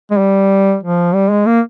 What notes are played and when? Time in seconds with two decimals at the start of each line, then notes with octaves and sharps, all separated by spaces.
0.11 G#3
0.19 G3
0.83 F3
1.14 G3
1.31 G#3
1.47 A#3